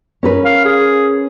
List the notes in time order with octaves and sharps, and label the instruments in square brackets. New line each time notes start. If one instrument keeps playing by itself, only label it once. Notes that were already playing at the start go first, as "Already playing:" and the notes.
[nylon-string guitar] C#4 A#4 B4
[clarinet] F5
G#4